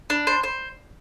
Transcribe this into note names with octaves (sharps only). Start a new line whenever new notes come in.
D4
C5
C5